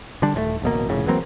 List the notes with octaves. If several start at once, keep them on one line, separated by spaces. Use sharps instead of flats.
D3 G3 D4
D#1 G#2 A3
D1 A1 B2 A#3
F1 A2 C#3
E3 F#3 A#3 C4